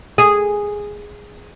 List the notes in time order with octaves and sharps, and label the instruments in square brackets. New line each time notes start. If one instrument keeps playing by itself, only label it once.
[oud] G#4